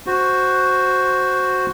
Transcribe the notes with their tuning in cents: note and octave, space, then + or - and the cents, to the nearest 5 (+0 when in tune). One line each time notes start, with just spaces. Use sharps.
F#4 +0 C5 +0